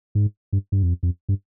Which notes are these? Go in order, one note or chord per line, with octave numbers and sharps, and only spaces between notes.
G#2
G2
G2
F2
F2
G2